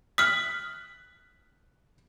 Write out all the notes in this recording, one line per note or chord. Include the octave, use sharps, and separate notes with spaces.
D#6 F6 F#6 B6